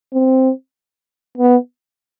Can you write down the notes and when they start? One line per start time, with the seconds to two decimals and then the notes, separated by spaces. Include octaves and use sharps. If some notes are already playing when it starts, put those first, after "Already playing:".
0.13 C4
1.38 B3